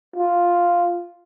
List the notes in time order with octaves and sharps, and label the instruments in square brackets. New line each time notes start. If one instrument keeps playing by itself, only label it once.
[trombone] F4